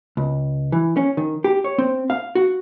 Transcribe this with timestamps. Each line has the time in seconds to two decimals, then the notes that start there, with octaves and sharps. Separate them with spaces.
0.17 C#2
0.72 E3
0.97 C#4
1.17 D#3
1.44 G4
1.64 C#5
1.78 C4
2.10 F5
2.35 F#4